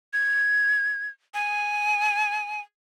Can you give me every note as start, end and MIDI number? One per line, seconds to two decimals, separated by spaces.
0.13 1.08 92
1.34 2.60 80